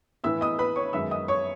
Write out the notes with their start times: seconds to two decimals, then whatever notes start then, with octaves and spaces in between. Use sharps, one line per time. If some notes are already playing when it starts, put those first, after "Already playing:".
0.24 A2 E3 B3 E5 E6
0.41 D#5 D#6
0.59 B4 B5
0.76 C#5 C#6
0.93 F#2 D#3 G#3 B3 E5 E6
1.11 D#5 D#6
1.28 C#5 C#6